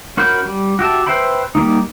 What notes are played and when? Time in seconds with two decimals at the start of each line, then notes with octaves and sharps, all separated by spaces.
0.17 C#4 F#4 A#4 B5 G6
0.45 G3
0.79 F#4 G4 E5 A5
1.06 B4 C5 E5 G5 B5
1.55 G3 G#3 A#3 D#4